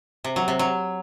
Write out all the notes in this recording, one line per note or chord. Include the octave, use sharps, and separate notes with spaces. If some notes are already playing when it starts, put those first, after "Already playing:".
C3
F#3
C3
F#3